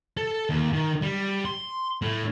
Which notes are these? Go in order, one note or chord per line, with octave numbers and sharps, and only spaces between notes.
A4
D#2
D#3
G3
C6
A2